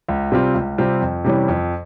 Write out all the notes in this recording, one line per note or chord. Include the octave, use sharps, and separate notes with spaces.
C#2
C3 G3 C4 F4
C#2
C3 G3 C4 F4
F2
C3 E3 G3 C#4
F2